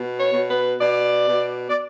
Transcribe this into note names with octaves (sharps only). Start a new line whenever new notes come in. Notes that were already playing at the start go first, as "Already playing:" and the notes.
Already playing: B2
C#5
B2
B4
B2 D5
B2
D5